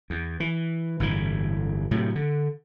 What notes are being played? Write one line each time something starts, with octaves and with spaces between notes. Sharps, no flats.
E2
E3
G1 A2 D3 E3
A2 C3 F#3
D3